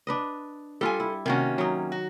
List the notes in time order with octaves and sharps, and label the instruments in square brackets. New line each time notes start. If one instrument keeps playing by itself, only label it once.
[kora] D4 B4 D#5
[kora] G3 F4 [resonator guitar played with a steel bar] A4 G#5
[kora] E4
[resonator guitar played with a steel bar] C3 A#3 C#4 [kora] D#3 F#4
[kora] F#3 D#4
[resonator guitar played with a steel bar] F#4